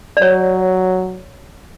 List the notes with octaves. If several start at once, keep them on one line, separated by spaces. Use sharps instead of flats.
D5
F#3 C#5